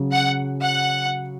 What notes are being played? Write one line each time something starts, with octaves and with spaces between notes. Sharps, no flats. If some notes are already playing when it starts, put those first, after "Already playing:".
Already playing: C#3 F#3 C#4
F#5
F#5